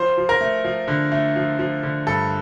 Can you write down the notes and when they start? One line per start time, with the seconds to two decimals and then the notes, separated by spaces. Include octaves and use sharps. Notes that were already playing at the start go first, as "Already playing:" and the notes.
Already playing: F3 C5
0.18 F3
0.29 A#4
0.41 A3
0.65 F3
0.88 D3
1.12 A3
1.36 F3
1.59 F3
1.83 D3
2.07 G2 A4